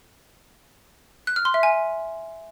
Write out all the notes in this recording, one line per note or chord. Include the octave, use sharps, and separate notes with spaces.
F#6
F6
C6
E5
G#5